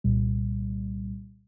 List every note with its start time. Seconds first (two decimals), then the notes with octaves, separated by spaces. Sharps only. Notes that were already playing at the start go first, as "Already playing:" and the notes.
0.04 C2 A#2 G3